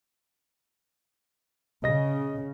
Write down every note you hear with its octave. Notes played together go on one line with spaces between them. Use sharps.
C#3 D#5 A#6